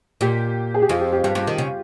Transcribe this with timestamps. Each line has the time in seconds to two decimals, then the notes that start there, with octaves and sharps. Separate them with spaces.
0.21 A#2 G4
0.74 G#4
0.82 G4
0.89 F2 F4
1.01 G4
1.13 G4
1.23 G2 G4
1.35 G2
1.47 D#3
1.58 C#3